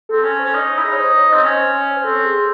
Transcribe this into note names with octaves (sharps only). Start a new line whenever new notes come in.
C4 A4
C#4 A4
C5
C#4
D#4 C#5
E4
D#4 G#4
C#5
C5
C#5
C4 D#5
C#4 C5
C#5
C5
C4 A4
G#4